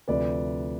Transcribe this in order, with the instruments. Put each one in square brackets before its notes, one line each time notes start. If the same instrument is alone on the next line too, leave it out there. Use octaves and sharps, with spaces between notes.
[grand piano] D2 C3 F3 B4 D5